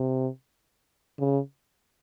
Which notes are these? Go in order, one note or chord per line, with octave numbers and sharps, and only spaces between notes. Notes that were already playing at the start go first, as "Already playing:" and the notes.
Already playing: C3
C#3